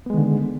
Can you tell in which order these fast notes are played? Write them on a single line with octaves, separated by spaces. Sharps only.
B3 G#3 D#3 D3